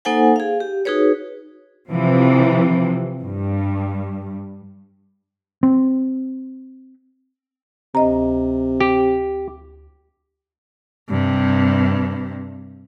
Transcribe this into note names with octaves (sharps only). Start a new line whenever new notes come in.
A#3 D#4 A4 C5 F#5 G#5
G#4 F5
G4
D#4 F#4 G#4 B4 C#5
C3 E3 F3
G2
C4
D2 C3 D#5 A#5
G4
G2 C3